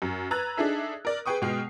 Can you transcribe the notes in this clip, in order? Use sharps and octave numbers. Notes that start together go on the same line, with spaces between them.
F#2
B4 A#5 E6 F#6 G#6 A6
D4 D#4 G#4 A4 E5
A#4 D5
G#4 B4 G5 C#6 D#6
B2 G#3 G5 F6 C7